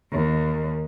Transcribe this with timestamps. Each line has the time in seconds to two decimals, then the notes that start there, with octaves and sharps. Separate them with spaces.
0.12 D#2